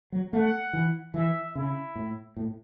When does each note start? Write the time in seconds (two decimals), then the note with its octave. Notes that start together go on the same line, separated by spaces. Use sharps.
0.12 F#3
0.33 A3 F#5
0.73 E3
1.14 E3 E5
1.55 C#3 E4
1.96 A2
2.37 A2